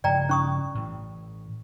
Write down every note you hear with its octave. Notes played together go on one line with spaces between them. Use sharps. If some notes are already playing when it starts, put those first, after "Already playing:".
G2 C#3 F3 D5 G5 A#5
C#4 C#6 D#6
A2 E3